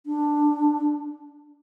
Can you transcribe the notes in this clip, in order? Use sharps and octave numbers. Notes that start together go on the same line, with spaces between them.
D4